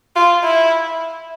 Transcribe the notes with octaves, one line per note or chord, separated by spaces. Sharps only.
F4
E4